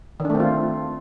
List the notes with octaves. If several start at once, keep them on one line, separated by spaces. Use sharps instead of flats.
D#3
D4
A3
C4
F4